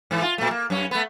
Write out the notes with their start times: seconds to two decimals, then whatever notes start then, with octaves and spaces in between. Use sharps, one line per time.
0.11 G#2 E3
0.22 F4
0.38 A#2 A3
0.51 A#3
0.70 F#2 C#4
0.91 A3 B3